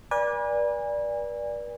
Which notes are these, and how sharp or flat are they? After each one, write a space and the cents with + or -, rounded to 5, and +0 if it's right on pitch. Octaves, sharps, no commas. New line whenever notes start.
B4 -40 D5 +0 G#5 -30